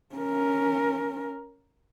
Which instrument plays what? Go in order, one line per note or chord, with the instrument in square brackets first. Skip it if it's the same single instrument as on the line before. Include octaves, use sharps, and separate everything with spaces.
[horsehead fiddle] C#4 A#4